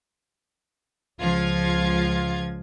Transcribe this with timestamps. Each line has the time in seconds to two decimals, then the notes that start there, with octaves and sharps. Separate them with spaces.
1.19 C#2 F3 F4 G#6